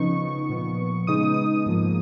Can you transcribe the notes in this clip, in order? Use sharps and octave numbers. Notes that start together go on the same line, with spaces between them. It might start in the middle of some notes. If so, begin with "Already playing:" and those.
Already playing: C#3 F3 B3 D#4 C#6
A#2 F3 B3
C#3 G#3 B3 D#4 D#6
D#6
G#2 F3 A#3